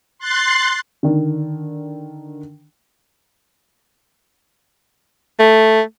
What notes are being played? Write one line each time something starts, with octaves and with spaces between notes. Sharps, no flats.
C6 F#6 A6 C7
D3 D#3
A3